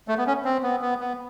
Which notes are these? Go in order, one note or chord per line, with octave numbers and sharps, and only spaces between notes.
A3
B3
C#4
C4
B3
B3
B3